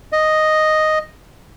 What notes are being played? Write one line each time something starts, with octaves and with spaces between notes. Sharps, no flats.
D#5